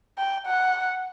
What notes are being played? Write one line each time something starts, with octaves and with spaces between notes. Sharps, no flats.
G5
F#5